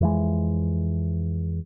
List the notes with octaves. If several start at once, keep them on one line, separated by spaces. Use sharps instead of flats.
F2 E3 G#3